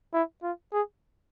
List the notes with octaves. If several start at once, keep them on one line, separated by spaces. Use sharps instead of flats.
E4
F4
G#4